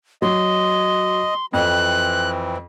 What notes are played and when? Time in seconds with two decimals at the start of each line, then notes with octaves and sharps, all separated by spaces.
0.22 F#3 D#5 C6
1.53 F2 E3 C4 F#6